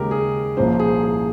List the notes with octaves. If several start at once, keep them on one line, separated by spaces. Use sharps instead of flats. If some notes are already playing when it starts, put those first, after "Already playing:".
Already playing: D#2 C#3 G#3 G4 A#4
G#4
C2 A#2 F3 A#3 C#4 C5
G#4
G#4